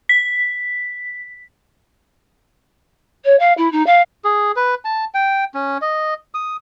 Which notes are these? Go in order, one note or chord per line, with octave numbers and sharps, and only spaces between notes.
B6
C#5
F5
E4
D#4
F5
G#4
B4
A5
G5
C#4
D#5
D#6